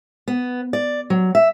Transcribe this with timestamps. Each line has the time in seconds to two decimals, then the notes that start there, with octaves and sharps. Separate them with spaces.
0.28 B3
0.73 D5
1.10 F#3
1.35 E5